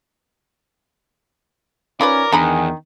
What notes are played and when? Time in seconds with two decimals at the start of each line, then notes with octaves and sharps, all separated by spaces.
2.01 C#4 D#4 F4 A#4 B4 D5
2.33 E2 D#3 D4 G#4 A#5 B5